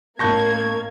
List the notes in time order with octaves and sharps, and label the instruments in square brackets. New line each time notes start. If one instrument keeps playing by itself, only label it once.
[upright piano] A1 B5 A#6 [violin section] A#3 G#6 [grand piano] A5 C#6 G6